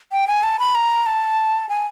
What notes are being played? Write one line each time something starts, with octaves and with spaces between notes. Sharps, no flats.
G5
G#5
A5
B5
A#5
A5
G#5